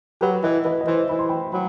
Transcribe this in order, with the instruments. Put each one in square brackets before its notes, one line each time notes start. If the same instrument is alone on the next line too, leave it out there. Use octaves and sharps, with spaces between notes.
[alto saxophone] F#3 [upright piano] G4 B4
[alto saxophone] E3 [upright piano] B4 D#5
[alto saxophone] E3 [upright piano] B4 D#5
[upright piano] D#5
[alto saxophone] E3 [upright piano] C5 E5
[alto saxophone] E3 [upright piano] B5
[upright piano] C6
G5 B5
[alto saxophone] F#3 [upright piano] G5 B5